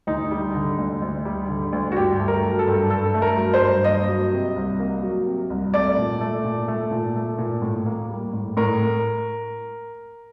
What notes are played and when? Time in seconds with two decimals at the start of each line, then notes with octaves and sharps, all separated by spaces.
0.07 D2 D#4
0.31 G3
0.55 D3
0.78 D2
1.02 D2
1.25 G3
1.49 D3
1.72 D2
1.92 F#4
1.96 G2 G4
2.19 A3
2.28 A#4
2.43 F#3
2.59 A4
2.67 G2
2.90 G2 A4
3.14 A3
3.22 A#4
3.37 F#3
3.54 C5
3.61 G2
3.84 A#3 D#5
4.08 F#3
4.32 C3
4.56 C2
4.79 A#3
5.03 F#3
5.26 C3
5.50 C2
5.74 A3 D5
5.97 A#2
6.21 A3
6.44 A#2
6.68 A3
6.91 A#2
7.16 A3
7.39 A#2
7.62 A2
7.86 A#3
8.10 G3
8.33 A2
8.57 A2 A#4